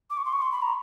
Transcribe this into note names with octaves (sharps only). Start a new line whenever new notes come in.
D6
C#6
C6
C#6
C6
B5
A#5